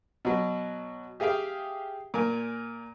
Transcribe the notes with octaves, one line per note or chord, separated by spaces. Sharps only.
B2 F#3
G4 G#4 E5 F5 G5
A#2 A#4 G#5